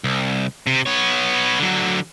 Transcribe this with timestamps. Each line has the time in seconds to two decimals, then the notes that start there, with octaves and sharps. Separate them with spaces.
0.04 C2
0.67 C3
0.86 B3 C#5
1.59 D3 F#3